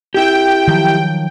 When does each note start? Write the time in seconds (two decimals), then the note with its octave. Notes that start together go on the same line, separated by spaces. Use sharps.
0.14 E4 G4 G5
0.67 D#3 F3 F#3